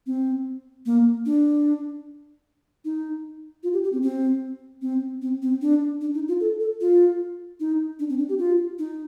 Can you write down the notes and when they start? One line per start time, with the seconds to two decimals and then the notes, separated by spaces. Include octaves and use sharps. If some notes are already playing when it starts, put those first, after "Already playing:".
0.07 C4
0.86 A#3
1.26 D4
2.85 D#4
3.63 F4
3.73 G4
3.84 G4
3.93 C4
4.03 C4
4.82 C4
5.22 C4
5.42 C4
5.62 D4
6.01 D4
6.14 D#4
6.28 F4
6.40 A4
6.60 A4
6.81 F4
7.60 D#4
7.99 D4
8.10 C4
8.18 D4
8.29 G4
8.39 F4
8.79 D#4